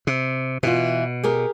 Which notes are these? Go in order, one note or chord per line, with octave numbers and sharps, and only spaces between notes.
C3
B2 E3 F4
G4 G#4 A#4